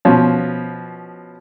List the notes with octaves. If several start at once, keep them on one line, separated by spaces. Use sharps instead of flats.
B2 F3 C#4